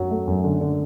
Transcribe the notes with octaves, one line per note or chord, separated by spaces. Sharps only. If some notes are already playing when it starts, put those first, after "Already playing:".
Already playing: F#2 F#3
A3
F#2
D3
D3